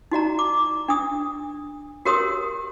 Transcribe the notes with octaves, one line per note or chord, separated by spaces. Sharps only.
D#4 F#4 D5 A#5
D6
D4 D#6
F#4 G4 A#4 C#5 C6 D#6